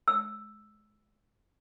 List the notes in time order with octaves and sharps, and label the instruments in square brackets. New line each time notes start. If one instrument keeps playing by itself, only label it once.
[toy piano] E6